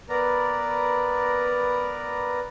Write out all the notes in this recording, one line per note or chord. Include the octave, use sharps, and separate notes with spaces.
B3 A#4 B4 D5 A#5